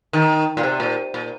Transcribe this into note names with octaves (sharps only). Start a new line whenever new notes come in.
D#3
A#2
C3
A#2
A#2